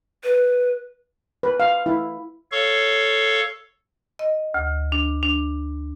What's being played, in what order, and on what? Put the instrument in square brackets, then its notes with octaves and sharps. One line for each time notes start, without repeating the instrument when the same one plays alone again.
[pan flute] B4
[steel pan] B4
F5
E4
[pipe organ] A4 C#5 F5 C#6
[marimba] D#5
D2
D4
D4